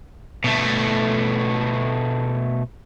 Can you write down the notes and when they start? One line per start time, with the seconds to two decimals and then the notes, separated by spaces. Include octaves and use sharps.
0.44 B2 A3